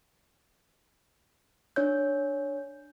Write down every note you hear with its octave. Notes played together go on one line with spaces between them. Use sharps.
D4 C#5 G6